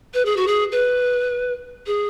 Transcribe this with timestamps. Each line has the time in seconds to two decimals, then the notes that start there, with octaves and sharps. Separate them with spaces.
0.14 B4
0.25 G#4
0.37 F#4
0.47 G#4
0.72 B4
1.86 G#4